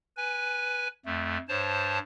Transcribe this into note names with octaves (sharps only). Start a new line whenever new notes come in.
B4 G#5
F2 A3
G2 C5 C#5 A5